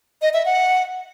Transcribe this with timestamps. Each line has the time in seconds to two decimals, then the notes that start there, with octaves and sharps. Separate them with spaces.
0.22 D#5
0.34 E5
0.45 F#5